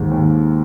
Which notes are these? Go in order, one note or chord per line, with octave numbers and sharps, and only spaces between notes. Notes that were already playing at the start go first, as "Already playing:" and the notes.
Already playing: D#2 G#2
D#2